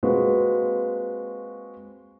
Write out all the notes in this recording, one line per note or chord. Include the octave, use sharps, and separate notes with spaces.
G#3 A#3 C4 F4 F#4 B4